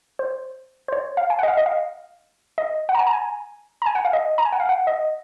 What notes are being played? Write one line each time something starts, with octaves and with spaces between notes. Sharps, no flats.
C5
C5
C#5
F5
G#5
F#5
D#5
F5
D#5
F5
D#5
F#5
A#5
G#5
A#5
G#5
A#5
G#5
F#5
F5
D#5
A#5
G#5
F#5
F5
F#5
D#5